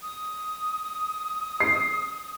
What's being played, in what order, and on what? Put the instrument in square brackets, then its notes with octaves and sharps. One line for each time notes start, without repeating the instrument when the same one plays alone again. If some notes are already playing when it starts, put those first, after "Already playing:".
[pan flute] D#6
[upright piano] C7